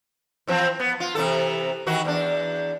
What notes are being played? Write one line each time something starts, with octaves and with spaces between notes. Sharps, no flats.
E3 F3 C4
B3
F4
C3 E3 A4
D#3 E3 F#4
E2 D4